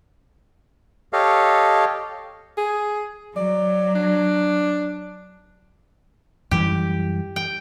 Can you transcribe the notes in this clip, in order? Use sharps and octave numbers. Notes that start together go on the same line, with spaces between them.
G4 A4 C#5 D#5 F5
G#4
F#3 D5
D4
F#2 E3 G3 G4
G5